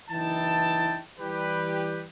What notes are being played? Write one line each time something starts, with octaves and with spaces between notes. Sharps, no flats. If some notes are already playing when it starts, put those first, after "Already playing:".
F#1 E3 D#4 E4 G5 A5
E3 G3 G4 B4